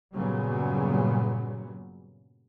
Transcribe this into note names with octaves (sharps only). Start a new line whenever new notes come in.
G2 A#2 C#3 F#3 G3 B3